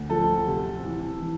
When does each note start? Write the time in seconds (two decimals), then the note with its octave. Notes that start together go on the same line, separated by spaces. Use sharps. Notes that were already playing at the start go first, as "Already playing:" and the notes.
Already playing: D2
0.10 F3 A4
0.47 C3
0.85 E3
1.22 E3